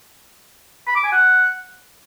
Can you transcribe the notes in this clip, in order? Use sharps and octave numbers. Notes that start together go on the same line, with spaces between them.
B5
D6
G#5
F#5